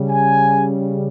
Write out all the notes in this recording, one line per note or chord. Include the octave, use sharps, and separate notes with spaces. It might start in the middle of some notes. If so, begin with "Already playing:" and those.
Already playing: C#3 G3
G#5